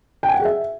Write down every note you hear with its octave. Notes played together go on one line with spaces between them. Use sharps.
G5
G#5
F#5
G#4
E5